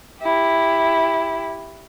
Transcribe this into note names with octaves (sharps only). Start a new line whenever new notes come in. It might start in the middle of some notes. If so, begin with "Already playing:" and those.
E4 G4